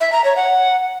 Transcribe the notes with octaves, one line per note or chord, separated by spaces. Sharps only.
E5
A#5
C#5
F#5